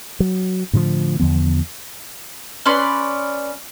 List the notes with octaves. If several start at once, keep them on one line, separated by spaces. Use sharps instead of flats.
F#3
A2 D3 E3 F3
E2 D3 F3 B3
C#4 B4 D5 C6